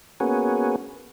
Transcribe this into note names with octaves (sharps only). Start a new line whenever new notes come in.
A#3 B3 C#4 F#4 G#4